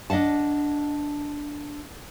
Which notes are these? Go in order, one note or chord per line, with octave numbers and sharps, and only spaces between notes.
D4 D#5 E5 F#5 A5